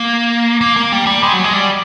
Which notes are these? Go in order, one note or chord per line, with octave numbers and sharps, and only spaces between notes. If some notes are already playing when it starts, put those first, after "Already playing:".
Already playing: A#3
A#3
A#3
G3
G3
G#3
F#3
G#3
G3